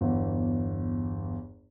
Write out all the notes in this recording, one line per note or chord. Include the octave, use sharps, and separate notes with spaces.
G1 E2